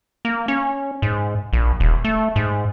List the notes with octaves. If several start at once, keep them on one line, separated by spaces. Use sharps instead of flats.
A#3
C#4
G#2
A#1
D#1
A3
G#2